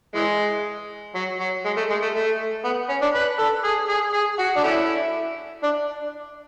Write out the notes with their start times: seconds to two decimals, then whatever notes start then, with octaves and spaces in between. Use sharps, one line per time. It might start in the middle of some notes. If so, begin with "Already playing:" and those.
0.15 E3 G#3
1.15 F#3
1.40 F#3
1.65 G#3
1.77 A3
1.90 G#3
2.02 A3
2.14 A3
2.64 B3
2.89 C#4
3.02 D4
3.15 B4
3.39 A4
3.64 G#4
3.89 G#4
4.14 G#4
4.39 F#4
4.57 D4
4.64 A3 C#4 E4
5.63 D4